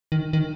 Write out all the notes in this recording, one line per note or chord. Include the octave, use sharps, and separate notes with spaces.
D#3
D#3